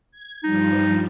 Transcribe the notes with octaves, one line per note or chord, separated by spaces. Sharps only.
G#6
G2 F3 G3 D#4